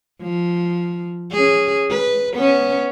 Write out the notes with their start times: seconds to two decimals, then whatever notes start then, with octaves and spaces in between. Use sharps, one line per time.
0.21 F3
1.32 C#4 G#4
1.90 B4
2.34 B3 C#4